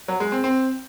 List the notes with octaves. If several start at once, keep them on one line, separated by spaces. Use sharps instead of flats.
F#3
G#3
C4
C4